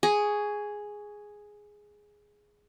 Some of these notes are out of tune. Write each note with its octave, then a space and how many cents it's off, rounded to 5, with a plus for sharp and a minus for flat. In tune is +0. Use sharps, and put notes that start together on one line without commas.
G#4 +0 C#6 +25